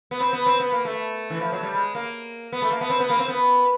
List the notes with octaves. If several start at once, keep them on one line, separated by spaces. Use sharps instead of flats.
B3
C4
B3
C4
B3
A#3
A3
E3
F3
F#3
G3
G#3
A#3
B3
A3
A#3
B3
C4
B3
A#3
C4
B3